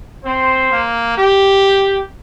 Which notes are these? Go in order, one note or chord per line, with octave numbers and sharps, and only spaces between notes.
C4 C5
A#3
G4